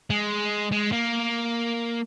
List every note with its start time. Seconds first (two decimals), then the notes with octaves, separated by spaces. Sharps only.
0.10 G#3
0.72 G#3
0.92 A#3